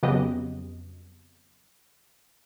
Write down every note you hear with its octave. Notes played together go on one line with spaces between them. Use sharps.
F2 C#3 F#3 B3 G4 D#5